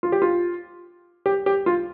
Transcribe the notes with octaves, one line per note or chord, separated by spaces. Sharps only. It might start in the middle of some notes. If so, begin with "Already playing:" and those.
F4
G4
F4
G4
G4
F4